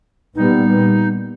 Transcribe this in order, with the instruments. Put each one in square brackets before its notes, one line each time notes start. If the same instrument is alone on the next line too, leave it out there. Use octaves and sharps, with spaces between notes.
[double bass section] A#2 G3 B3 [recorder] D#4